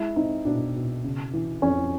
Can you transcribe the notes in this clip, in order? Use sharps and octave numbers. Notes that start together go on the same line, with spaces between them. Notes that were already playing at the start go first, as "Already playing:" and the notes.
Already playing: G#3 E4
C4 D#4
B2 D4
B2
C#3
E3
F2 C#4